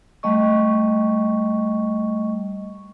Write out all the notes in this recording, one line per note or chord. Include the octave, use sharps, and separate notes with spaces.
G3 A3 D#5 C#6